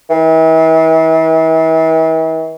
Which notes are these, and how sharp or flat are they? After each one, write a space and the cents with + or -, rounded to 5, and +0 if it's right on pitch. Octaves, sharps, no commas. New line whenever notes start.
E3 -40